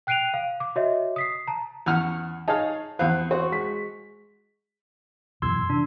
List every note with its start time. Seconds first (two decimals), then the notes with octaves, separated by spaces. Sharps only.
0.07 G5 F#6 C7 D7 D#7 F7
0.34 F5
0.60 D6
0.76 F#4 C#5 D#5 E5
1.16 D#6 B6 C7
1.48 A5 A#5
1.86 E2 C#4 F#5 F6
2.48 D#4 G#4 C#5 F5 A5
2.99 E2 C4 F5 F#6
3.31 F#4 C5
3.52 G#3 B6
5.42 F#2 B2 E3 C6 E6 G#6
5.70 C3 E3 D4